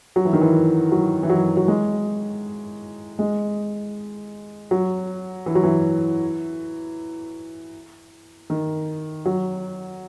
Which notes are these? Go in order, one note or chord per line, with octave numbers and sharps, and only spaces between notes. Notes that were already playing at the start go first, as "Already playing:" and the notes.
F#3
E3
D#3
E3
F#3
E3
F#3
F#3
G#3
G#3
F#3
E3
F#3
E3
D#3
F#3